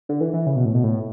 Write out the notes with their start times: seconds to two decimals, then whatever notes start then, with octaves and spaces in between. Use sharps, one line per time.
0.09 D3
0.21 E3
0.33 E3
0.47 C#3
0.56 B2
0.65 A2
0.75 B2
0.84 A2